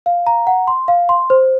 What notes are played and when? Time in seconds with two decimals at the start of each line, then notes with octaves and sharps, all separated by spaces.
0.06 F5
0.27 A#5
0.47 F#5
0.68 C6
0.88 F5
1.09 C6
1.30 C5